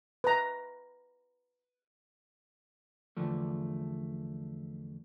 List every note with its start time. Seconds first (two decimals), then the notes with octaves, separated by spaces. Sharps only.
0.24 B4 A#5
3.17 E2 D3 F3 A3